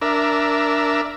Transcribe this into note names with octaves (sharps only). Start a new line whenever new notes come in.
D4 A#4 E5